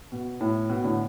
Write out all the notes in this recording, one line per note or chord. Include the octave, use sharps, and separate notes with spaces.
B2
A2
B2
A2 D3